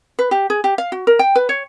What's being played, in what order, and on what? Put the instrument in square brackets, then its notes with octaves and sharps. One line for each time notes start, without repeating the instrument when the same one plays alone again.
[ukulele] B4
G4
G#4
G4
F5
F#4
A#4
G5
B4
C#5